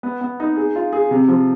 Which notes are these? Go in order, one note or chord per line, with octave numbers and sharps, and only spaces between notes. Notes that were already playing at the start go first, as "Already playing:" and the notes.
B3
B3
D#4
G#4
F4
G#4
C3
F3